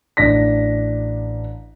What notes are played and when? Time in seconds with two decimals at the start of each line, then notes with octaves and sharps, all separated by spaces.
0.17 A1 D4 A#6 B6